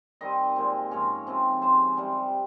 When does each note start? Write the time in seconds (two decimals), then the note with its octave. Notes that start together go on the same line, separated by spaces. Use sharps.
0.21 D#3 G3 C4 D#5
0.56 A#2 G#3 C4
0.91 G#2 F3 G#3 C#4 C#5
1.27 C3 F3 C4
1.61 C#3 G#3 C4 C5
1.97 C3 G3 C4